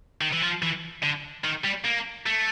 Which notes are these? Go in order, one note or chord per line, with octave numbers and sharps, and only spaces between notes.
D#3
E3
F3
E3
D3
D#3
G3
A#3
A3